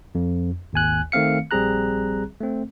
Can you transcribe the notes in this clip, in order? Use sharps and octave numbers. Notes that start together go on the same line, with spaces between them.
F2
G#1 D#2 G#5 F#6
D#3 A3 C4 F5 C#7
A#1 G3 C4 G#4 A#5 F#6
A3 C4